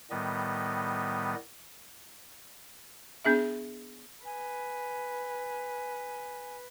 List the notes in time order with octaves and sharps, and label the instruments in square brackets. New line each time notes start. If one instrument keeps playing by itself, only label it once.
[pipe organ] A2 D#3 G3 B3 D#5
[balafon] B3 D4 G#4 E5
[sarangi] B4 [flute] G#5